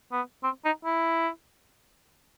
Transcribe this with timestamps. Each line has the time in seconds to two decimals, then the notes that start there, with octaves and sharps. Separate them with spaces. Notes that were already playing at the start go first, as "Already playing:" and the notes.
0.12 B3
0.44 C4
0.65 D#4
0.85 E4